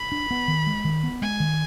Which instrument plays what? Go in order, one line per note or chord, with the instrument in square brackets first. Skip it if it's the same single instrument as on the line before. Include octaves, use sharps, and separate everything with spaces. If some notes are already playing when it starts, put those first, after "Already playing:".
Already playing: [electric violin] B5
[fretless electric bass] D4
B3
D#3
G#3
D#3
B3
[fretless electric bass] G#3 [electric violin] G#5
[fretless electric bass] D#3